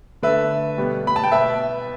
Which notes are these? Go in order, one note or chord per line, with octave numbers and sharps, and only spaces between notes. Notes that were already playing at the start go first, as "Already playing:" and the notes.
D3 A3 B4 E5
B2 G3 B3
B5
A5
G5
B2 B3 B4 E5